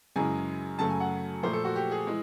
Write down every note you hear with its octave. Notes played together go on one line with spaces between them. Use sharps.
F#2 C#3 E3 G#3 G#5
F#2 C#3 F#3 A3 A5
G#5
F#5
A#2 F3 A3 C5
A4
F#4
G4
G#4
E3 G#3